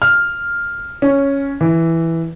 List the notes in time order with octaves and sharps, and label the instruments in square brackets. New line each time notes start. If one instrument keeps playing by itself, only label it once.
[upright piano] F6
C#4
E3